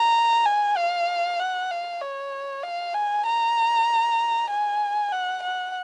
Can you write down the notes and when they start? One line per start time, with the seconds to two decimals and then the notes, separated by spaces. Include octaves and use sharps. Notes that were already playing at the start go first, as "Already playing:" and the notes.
Already playing: A#5
0.45 G#5
0.77 F5
1.40 F#5
1.71 F5
2.02 C#5
2.63 F5
2.94 G#5
3.26 A#5
4.50 G#5
5.12 F#5
5.43 F#5